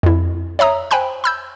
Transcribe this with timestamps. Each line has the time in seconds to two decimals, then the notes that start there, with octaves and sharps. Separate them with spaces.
0.03 F2 E4
0.59 C#5 E5 A#5 D#6
0.91 C5 G5 G#5 B5 F#6
1.24 B5 E6 G6